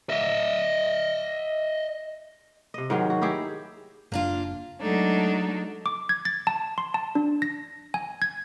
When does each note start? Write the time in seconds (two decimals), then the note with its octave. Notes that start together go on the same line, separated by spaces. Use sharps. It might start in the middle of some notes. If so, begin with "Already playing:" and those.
0.10 D#5 E5
2.74 C3 D#5
2.90 G#2 D#3 F#3 G#3
3.10 F#4
3.21 D#4 E4 G4 G#4
4.12 F#1 A#3 D4 F4
4.81 F#3 G#3 A3 D4 D#4
5.86 D6
6.09 G#6
6.25 A6
6.47 A5
6.78 C6
6.94 A5
7.15 D4
7.42 A#6
7.94 G#5
8.22 G#6